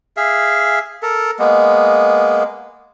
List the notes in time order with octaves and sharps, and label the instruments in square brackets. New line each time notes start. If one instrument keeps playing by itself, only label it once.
[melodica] G#4 E5 F5
A4 A#4
G#3 A#3 B3